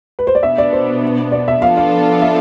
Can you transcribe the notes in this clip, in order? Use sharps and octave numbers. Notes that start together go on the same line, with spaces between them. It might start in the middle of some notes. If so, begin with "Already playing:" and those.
B4
C5
D5
B2 B3 D4 E5
D5
C5
D5
E5
F3 B3 D4 F4 A4 F5
F5
E5